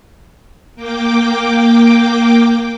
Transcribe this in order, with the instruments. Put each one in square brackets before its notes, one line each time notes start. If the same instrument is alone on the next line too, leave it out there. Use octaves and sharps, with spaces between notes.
[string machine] A#3 G5 D6